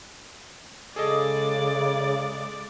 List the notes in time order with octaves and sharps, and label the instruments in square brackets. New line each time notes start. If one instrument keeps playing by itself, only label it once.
[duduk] C#3 [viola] G#3 D5 [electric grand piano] G#4 A4 D#5